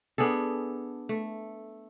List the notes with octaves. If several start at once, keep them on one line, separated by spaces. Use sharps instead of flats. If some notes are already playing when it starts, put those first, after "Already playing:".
B3 D4 G#4 A4
A3